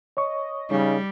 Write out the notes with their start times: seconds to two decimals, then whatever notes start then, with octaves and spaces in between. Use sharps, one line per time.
0.17 C#5 D#5 C#6
0.71 C#3 G3 D#4